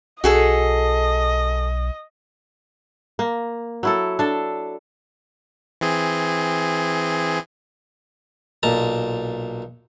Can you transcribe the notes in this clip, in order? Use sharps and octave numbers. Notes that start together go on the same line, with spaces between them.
B1 F#4 G#4 A4 D#5
A#3
F#3 E4 A4
D4 A4
E3 C4 G#4
B1 A#2 A5 A#5